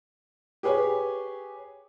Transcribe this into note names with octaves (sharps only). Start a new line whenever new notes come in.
G4 G#4 B4 C#5